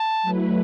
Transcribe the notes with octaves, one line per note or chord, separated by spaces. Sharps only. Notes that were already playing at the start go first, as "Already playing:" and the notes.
Already playing: A5
F#3 A3 E4 B4